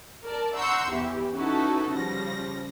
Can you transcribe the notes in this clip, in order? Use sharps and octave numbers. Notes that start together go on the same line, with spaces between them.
A#4 D5 A5
F#5 A#5 C6 C#6 E6 G6
E2 E3 G4
C#4 D#4 E4 F#4 A4 B4
C#3 F3 G3 A#6